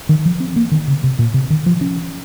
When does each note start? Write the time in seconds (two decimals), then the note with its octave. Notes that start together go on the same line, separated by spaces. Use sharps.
0.09 D#3
0.25 F3
0.40 C4
0.56 A#3
0.71 D#3
0.88 C#3
1.04 C3
1.19 A#2
1.34 C3
1.50 D#3
1.66 F3
1.81 C#4